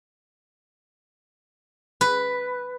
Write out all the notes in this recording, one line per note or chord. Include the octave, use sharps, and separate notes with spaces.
B4